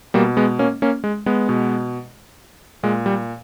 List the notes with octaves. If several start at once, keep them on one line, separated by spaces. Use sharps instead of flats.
B2 G3 A#3
G#3 B3
A#3 C#4
A#3 C#4
G#3
G#3 B3
B2
A#2 G#3
G3